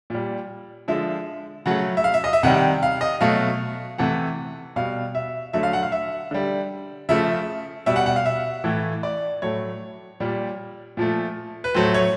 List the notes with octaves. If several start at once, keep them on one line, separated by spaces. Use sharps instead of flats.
A#2 G3
D3 F3 G#3 E5
C#3 F#3 A3 F#5
E5
F5
E5
D#5
E5
C3 D#3 G3 F#5
F5
D#5
B2 F#3 A3 F5
C3 E3 A3 F#5
B2 G3 F5
E5
D3 F#3 A3 E5
F5
F#5
F5
E5
D3 G3
C#3 F3 A3 E5
B2 G3 E5
F#5
F#5
F5
E5
A2 E3 A3
D5
A2 F#3 A3 C#5
A#2 G3
A#2 F3 A3
B4
A2 F#3 A3 C5
C#5